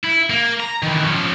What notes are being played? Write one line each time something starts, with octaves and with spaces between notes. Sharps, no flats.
E4
A#3
A#5
D#3 E3
F3 C#4